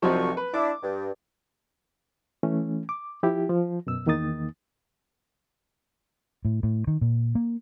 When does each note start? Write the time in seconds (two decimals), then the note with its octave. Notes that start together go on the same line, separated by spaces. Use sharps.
0.02 C2 F3 F#3 C4 D#4 C#6
0.37 B4
0.54 D4 E4 D6
0.83 G2
2.43 E3 A3 C#4
2.89 D6
3.23 F3 E4 G4
3.49 F3
3.87 F#2 B2 E6
4.06 E2 D#3 A#3 D#4 D#6 A6
6.45 A2
6.63 A2
6.87 D#3
7.01 A#2
7.35 A#3